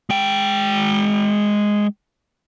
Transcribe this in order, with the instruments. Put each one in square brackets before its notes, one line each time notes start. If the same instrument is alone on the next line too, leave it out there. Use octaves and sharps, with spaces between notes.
[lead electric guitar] G#3 G5